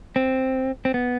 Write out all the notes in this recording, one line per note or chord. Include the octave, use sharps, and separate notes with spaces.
C4
C4
B3